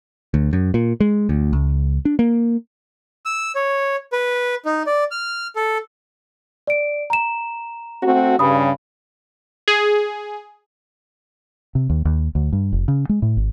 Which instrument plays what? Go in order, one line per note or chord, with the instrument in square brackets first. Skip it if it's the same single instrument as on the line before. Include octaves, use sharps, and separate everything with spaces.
[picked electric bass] D2
F#2
A#2
G#3
D2
C#2
D4
A#3
[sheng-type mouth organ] E6
C#5
B4
D#4
D5
F6
A4
[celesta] D5 D7
A#5 E7
[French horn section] A3 C4 F#4
[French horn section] G2 C#3 [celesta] B5 D#6
[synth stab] G#4
[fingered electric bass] C3
D#2
D#2
D2
G2
F1
C#3
G#3
A2
G#1